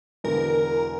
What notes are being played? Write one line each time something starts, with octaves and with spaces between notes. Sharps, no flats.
E1 E2 D3 A#4